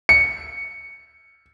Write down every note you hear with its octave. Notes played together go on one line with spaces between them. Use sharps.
C#7